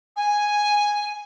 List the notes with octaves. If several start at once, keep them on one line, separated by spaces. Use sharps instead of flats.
G#5